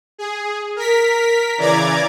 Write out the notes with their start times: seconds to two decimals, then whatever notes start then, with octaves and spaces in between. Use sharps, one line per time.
0.18 G#4
0.76 A#4 B6
1.57 C#3 E3 D5 A#5 D6 G#6